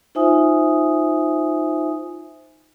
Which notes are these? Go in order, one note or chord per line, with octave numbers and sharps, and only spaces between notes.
D#4 F4 C5 E5 G#5 D#6